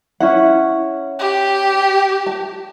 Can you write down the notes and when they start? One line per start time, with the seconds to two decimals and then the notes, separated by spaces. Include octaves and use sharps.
0.20 C#4 E4 F#5
1.20 G4
2.27 A5